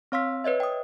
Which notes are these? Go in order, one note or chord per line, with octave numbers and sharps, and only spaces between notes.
C4 C#5 F5 C6 E6 B6
B4 C#5 D#5 E5
G5 D#6